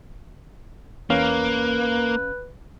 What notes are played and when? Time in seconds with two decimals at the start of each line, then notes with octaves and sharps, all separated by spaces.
1.10 E2 A#3 C#4 B4 F5